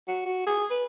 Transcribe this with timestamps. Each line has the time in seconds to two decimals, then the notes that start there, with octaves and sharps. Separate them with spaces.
0.08 F#4
0.25 F#4
0.46 G#4
0.70 B4